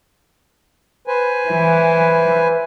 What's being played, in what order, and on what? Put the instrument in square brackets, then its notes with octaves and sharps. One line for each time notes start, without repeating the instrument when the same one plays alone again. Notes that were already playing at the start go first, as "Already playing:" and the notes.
[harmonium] B4 C5 G#5
[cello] E3